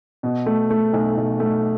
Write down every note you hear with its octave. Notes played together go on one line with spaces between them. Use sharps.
B2
A3
A3
B1
B1
A3